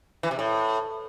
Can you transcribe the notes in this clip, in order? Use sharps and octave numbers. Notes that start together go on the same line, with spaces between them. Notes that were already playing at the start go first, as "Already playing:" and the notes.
E3
C3
A2